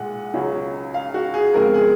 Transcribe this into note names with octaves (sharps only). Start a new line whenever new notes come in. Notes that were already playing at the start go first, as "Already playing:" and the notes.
Already playing: B1 A#2 G#3 F#5
C#2 C#3 F#3 C#4
F5
F#4
G#4
F2 C#3 G#3 B3 A#4
G#4